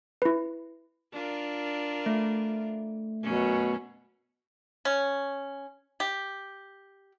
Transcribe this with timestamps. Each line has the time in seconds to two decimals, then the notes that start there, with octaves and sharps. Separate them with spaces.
0.22 E4 B4
1.12 D4 F4 A#4
2.06 A3
3.23 F#2 B2 C#4
4.85 C#4
6.00 G4